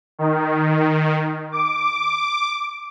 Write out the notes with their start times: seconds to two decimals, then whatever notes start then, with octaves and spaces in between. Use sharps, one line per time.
0.19 D#3
1.52 D6